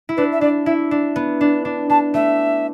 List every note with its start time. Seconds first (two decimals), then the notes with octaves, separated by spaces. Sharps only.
0.09 E4
0.17 D4 B4
0.32 E5
0.41 D4 D5
0.66 E4 E5
0.91 D4
1.16 B3
1.41 D4
1.65 D4
1.90 D4 A5
2.14 A3 E5